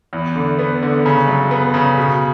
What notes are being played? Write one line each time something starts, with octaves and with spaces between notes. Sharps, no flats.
E2
D3
B3
D3
C#3
F#2
B3
C#3
B2